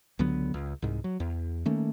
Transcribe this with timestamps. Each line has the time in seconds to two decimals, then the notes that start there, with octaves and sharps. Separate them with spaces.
0.19 C#2 D3 F#3 B3
0.54 C#2
0.82 C2 G#2
1.04 F#3
1.20 E2
1.65 D#3 A3 A#3 C#4